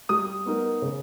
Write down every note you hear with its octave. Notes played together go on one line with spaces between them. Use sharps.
G3 D#6
B3 D#4 A#4
C#3